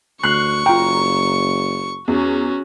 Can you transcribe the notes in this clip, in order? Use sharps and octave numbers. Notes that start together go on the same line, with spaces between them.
D2 C#6 F6 F#6 C7 C#7
F#1 F4 G5 A#5
E2 C#4 F#4